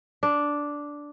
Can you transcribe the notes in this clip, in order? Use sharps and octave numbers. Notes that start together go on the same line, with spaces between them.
D4